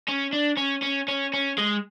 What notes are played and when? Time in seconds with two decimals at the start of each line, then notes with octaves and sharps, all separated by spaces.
0.08 C#4
0.33 D4
0.57 C#4
0.82 C#4
1.08 C#4
1.33 C#4
1.58 G#3